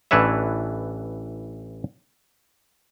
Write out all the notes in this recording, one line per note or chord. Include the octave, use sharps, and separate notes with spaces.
A1 E3 D4 B4 C#5 E5